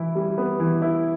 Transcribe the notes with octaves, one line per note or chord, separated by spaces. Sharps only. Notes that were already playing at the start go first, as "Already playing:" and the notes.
Already playing: E3 E4
G3
B3
E3
E4